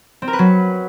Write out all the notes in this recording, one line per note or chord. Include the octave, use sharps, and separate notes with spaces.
C4
A#4
B4
F#3